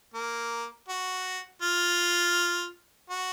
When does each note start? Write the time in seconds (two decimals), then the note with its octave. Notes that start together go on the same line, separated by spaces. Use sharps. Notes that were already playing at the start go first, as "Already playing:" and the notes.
0.14 A#3
0.89 F#4
1.62 F4
3.10 F#4